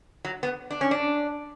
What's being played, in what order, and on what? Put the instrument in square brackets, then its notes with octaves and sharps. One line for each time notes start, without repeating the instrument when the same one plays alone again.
[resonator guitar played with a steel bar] F#3
B3
D4
C#4
D4